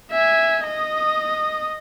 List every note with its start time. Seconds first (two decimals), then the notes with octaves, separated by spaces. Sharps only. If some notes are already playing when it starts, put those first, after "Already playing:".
0.11 E5 G#5
0.65 D#5 D#6